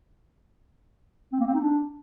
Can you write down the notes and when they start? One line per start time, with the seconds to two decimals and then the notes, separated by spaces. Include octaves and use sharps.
1.33 C4
1.40 A#3
1.47 C4
1.54 D#4
1.61 D4